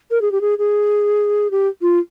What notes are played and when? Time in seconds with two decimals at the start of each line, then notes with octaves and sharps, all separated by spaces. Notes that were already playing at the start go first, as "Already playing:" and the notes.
0.11 A#4
0.21 G#4
0.32 G4
0.41 G#4
0.58 G#4
1.51 G4
1.82 F4